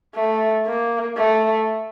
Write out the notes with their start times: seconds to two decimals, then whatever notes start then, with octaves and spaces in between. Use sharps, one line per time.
0.15 A3
0.66 A#3
1.17 A3